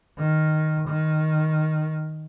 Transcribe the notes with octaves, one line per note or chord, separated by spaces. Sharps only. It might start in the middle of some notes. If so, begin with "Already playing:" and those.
D#3
D#3